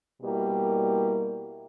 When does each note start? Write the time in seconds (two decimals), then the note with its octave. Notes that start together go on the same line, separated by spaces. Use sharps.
0.21 B2 G3 A#3 E4 G4